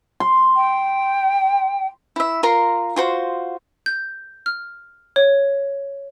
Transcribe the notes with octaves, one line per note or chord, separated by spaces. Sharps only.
C6
G5
E4 E5
F4 A#4 A#5 C6
F4 F#4 C5
G6
F6
C#5